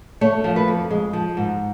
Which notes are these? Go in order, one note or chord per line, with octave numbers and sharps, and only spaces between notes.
A3 C#5
F3
B4
F2
G#3
F3
G#2